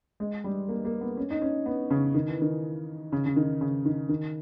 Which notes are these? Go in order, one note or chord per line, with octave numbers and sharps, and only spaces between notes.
G#3
G3
A#3
A#3
B3
C#4
D#4
C#4
B3
C#3
D#3
E3
D#3
C#3
C#3
D#3
C#3
D#3
D#3